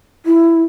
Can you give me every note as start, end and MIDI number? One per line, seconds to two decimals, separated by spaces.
0.26 0.62 64